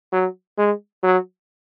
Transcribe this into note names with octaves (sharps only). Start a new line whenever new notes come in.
F#3
G#3
F#3